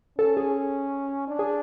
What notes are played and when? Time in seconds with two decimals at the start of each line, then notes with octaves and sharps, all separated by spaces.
0.18 C#4 A4
0.37 G#4
1.28 D4
1.39 G#4